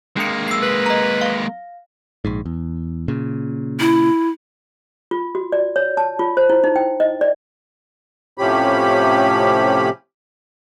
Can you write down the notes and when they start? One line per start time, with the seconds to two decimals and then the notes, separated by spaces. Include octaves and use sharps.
0.17 G#3 A#3 D4 C#7
0.48 E6 C7
0.62 B4
0.86 D#5 A#5
1.21 F5
2.25 A#1 G#2
2.46 E2
3.08 A#2 C#3
3.80 E4
5.11 F4
5.35 F#4
5.52 D5
5.76 C#5
5.97 A5
6.19 F4
6.37 C5
6.50 E4
6.64 D#4
6.76 G5
7.00 D#5
7.21 D5
8.38 A2 C3 F3 C#4 G4 B5